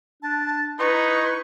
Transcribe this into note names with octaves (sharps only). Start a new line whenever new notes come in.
D4 A5
D#4 E4 B4 C#6